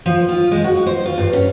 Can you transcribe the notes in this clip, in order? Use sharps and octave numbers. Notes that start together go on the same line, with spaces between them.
F3
F4
G#3
F#4
C5
F4
G2
C#4